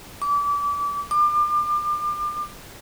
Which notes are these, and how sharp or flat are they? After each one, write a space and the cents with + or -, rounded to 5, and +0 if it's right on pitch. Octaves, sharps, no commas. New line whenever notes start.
D6 -30
D6 +35